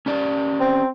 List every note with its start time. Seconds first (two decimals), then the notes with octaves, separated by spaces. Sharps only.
0.06 C#4 G4 D5
0.60 C4